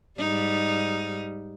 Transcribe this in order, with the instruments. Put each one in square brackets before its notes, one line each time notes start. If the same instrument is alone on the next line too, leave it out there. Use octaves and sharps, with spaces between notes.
[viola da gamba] G#2 G3 D#4